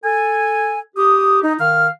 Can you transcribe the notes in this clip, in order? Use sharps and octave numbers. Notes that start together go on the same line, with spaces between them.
A4 G#5
G4 D#6
D#4
D#3 F5 F6